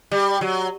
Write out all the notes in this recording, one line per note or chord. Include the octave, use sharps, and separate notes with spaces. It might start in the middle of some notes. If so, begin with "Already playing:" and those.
G3
F#3